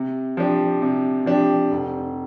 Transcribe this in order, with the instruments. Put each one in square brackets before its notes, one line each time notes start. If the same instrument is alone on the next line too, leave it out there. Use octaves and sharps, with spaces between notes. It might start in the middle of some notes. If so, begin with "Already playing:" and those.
Already playing: [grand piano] C3
F3 D4 G4
C3
F3 D4 G4
F1